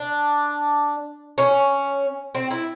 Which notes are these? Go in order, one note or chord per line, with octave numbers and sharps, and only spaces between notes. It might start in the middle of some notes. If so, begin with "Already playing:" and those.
Already playing: D4
C#4
C4
E4